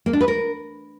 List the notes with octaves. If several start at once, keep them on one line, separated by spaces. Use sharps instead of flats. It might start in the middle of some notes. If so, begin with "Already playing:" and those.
A#3
D4
B4
A#4